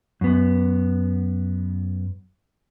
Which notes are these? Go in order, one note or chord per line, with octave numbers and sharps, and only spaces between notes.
F#2 B3